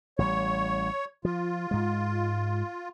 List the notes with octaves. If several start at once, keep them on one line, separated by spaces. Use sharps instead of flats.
A1 G3 C#5
F3 F4
G#2 G#3